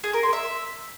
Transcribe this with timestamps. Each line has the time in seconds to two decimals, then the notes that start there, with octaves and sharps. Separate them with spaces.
0.04 G#4
0.13 A#4
0.23 C6
0.33 E5